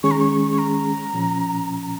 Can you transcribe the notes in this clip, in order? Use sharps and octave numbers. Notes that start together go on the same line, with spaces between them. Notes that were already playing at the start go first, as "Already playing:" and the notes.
D#3 G#3 C#4 G#4 C#6
A#5
C#6
C#6
A#5
A#2 F3 C#4